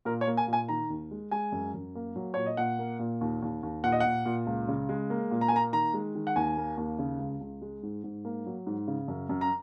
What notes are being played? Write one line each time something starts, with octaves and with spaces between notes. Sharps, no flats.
A#2 A#4
C#5
A#3
G#5
A#2
G#5
D#3 A#5
D#2
G#3
G#3 G#5
F#2
F#2
A#3
F#3
A#2 C#5
D#5
A#2 F#5
A#3
A#2
D#2
D#2
D#2
A#2 F#5
D#5
A#2 F#5
A#2
C#2
C#3
G#3
A#3
A#2
A#5
G#5
A#3 A#5
D#3 A#5
G#3
D#3
F#5
D#2 G#5
A#3
D#2
C#3
C#2
C#2
G#3
G#2
G#2
A#3
F#3
G#2
C#3
F#2
F#2
A#5